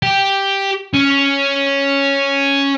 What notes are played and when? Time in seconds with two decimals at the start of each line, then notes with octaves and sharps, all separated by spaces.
0.03 G4
0.93 C#4